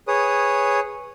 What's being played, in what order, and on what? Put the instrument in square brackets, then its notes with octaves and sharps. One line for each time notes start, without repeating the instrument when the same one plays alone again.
[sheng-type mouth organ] G#4 B4 C#5 D#6